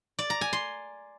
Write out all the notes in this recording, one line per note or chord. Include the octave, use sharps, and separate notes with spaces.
D5
A#5
G#5
C6